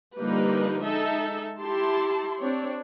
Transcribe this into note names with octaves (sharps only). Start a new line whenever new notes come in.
D3 F3 G3 A#3 D#4 B4
G#3 D#4 A4 E5
E4 G4 A5 C6
C4 D4 C#5